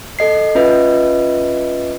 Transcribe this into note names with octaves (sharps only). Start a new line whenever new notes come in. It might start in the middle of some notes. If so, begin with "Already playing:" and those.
A4 D#5 C7
C#4 F4 B4 D#5 E5